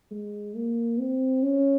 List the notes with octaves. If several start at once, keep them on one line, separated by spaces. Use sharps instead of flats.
G#3
A#3
C4
C#4